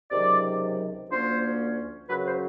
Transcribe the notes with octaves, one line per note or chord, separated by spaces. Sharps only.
C#2 C3 D#3 F#3 D5
D2 D3 F3 A#3 C#4 C5
F#2 C#3 F#3 B4
C5